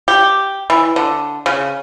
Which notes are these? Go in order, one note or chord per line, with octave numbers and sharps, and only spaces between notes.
G4
E3
D3
C#3